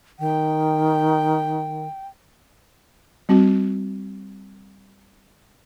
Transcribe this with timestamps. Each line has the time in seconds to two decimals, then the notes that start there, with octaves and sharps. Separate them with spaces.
0.19 D#3 G5
3.29 G3 C4 F#4